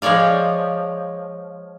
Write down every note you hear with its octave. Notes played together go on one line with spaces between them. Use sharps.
F3 G#3 C#5 D5 F5